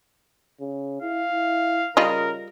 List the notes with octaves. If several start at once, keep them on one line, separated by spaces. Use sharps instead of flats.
C#3
E4 F5
E4
C#3 G3 F4 A#4 D#5